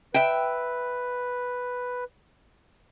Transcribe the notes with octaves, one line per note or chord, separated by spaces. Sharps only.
B4 E5 G5